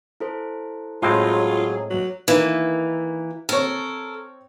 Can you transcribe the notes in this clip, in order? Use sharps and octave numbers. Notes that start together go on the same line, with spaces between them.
E4 A4 C5
A2 F#3 G#3 C4 F4 G#4
F#3
D#3 E3 A#3 E4
C4 A4 A#4 C#5